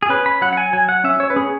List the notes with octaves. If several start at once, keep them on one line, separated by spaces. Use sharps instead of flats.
G#4
C#4 B4
B5
F#3 F#5
F#5
G#5
F#3 G#5
F#5
C#4 E5
C#5
B4
C#4 G#4